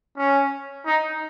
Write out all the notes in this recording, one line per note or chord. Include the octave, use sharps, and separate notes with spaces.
C#4
D#4